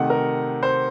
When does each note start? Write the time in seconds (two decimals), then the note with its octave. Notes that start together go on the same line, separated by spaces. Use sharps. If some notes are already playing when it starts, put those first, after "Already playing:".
Already playing: C3 D#3 A3 F#5
0.10 A#4
0.63 C5